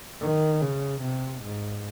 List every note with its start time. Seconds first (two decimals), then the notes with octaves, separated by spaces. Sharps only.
0.21 D#3
0.62 C#3
1.02 C3
1.43 G#2